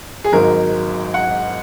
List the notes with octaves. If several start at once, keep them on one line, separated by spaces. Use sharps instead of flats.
G#4
G#1 G#2 F#3 A#4
F#5